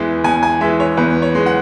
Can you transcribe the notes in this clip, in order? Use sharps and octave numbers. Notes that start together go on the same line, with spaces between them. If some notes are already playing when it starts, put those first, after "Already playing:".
Already playing: E2 E3 G#3
E2 G#5
G#5
E3 G#3 E5
C#5
E2 B4
C#5
E3 G#3
F#5